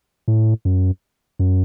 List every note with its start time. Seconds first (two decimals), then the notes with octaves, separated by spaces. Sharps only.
0.28 A2
0.65 F#2
1.39 F#2